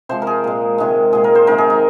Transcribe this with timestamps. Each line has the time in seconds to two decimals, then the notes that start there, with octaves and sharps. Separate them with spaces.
0.09 C3 F3 G#3 C5
0.22 A#4
0.27 G#4
0.44 A#2 G#3
0.78 C3 D#3 G#3
1.13 A#2 G#3 G#4
1.24 A#4
1.35 C5
1.47 C3 D#3 G#3 A#4
1.58 G#4
1.70 D#4